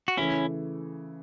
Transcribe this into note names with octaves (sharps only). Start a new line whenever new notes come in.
F#4
C#3 E3 A3 C#4 E4